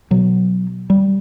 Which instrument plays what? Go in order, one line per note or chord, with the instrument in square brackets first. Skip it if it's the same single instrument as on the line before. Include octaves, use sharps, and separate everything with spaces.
[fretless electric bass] B2 F#3
G3